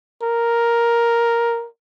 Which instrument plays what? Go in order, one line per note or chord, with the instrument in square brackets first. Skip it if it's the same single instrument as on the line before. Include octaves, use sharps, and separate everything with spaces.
[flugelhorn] A#4